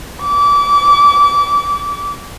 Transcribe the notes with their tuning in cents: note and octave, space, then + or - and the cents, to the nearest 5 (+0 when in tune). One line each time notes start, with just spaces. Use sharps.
D6 -30